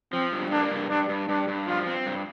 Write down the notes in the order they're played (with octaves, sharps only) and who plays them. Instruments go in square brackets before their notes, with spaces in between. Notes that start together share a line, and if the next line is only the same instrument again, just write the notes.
[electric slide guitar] F3 [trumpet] C4
[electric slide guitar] G2
[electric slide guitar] A#3 [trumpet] D4
[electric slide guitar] G2
[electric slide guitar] G2 [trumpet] D4
[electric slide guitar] G2
[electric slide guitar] G2 [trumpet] D4
[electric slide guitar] G2
[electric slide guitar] F3 [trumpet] F4
[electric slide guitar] C4
G2